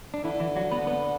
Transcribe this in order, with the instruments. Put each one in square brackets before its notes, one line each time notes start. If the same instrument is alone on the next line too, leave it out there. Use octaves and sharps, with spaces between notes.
[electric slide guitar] D4
[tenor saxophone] D3 [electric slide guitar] E3 E4
[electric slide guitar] E3 E4
F#3 F#4
B3 B4
B3 B4